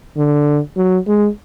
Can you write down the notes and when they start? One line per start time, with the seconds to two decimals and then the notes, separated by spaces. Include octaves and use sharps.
0.17 D3
0.76 F#3
1.07 G#3